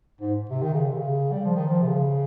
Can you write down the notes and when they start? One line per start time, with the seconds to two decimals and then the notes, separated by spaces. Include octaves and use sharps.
0.21 G#2
0.50 C3
0.63 D#3
0.74 C#3
0.86 C3
0.97 C#3
1.32 G3
1.45 F3
1.56 D#3
1.68 F3
1.82 C3
1.88 C#3